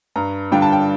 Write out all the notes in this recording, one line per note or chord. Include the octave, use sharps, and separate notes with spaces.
G2 A#5
D3 G3 D4 F4 G5
A5
G5